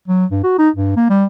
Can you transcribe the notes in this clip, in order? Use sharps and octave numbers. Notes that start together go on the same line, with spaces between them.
F#3
G2
F#4
D#4
G2
A#3
G3